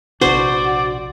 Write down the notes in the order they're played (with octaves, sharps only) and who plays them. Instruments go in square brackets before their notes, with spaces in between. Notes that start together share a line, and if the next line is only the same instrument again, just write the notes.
[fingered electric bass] A#1 C3 D4 [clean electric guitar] F#4 [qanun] C5 [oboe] D5